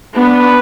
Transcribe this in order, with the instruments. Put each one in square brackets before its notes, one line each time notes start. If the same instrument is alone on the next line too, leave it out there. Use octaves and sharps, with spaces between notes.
[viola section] B3 D4 [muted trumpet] B4